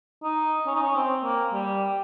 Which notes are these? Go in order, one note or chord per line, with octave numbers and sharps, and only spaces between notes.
D#4
C#4
D#4
C#4
C4
A#3
G3